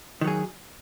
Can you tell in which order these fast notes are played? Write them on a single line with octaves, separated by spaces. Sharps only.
D#3 F#3 G#4